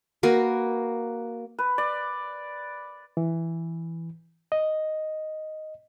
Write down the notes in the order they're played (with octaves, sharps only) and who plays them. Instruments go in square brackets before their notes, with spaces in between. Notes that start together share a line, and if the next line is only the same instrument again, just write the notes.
[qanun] A#3 F#4 A#4 B4
[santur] B4
D5
[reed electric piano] E3
D#5